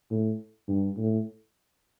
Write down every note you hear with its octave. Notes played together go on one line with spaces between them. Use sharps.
A2
G2
A2